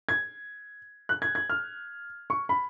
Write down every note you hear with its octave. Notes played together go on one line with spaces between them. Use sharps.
G#6
F#6
G#6
G#6
F6
C#6
B5